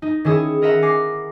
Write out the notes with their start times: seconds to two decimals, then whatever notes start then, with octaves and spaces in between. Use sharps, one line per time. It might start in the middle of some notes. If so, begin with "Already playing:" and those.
0.02 D#4
0.25 D#3 C#4 E4 G#4 D#6
0.62 A#4 D#5 E5 F#5 A#5
0.82 G#5 D6 A#6 C7